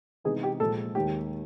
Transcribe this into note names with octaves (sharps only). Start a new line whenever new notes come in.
C3 E3 G#3 B3 D#4 G#4
G4
A#2 F3 G#3 A4
D#2 D#3 G#3 G4